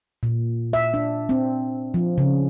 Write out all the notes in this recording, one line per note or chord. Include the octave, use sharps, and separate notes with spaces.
A#2
E5
D4
C4
F3
C#3